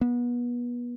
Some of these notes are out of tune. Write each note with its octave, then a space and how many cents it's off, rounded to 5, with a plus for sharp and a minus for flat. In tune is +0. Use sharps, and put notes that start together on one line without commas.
B3 -30